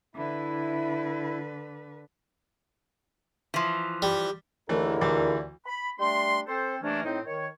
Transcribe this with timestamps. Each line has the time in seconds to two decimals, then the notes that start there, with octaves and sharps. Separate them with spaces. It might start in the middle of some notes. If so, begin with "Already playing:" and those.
0.15 D3 E4 B4
3.54 E3 F3
4.02 G3
4.69 D#2 D3 E3 A3 E4 G#4 A#4
5.01 D2 E3 D6
5.66 B5
5.99 G3 A3 D4 C6
6.48 C4 A4 C5
6.82 C3 E3 A3 A#3 C#4 D4
7.04 A2 C4 D#4
7.26 D#3 C#5